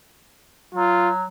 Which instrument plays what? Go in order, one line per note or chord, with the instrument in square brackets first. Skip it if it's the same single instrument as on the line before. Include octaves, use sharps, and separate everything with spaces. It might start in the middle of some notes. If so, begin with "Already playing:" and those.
[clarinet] F#3 [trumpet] F4